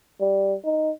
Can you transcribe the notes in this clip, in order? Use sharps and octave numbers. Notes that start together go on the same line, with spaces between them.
G3
D#4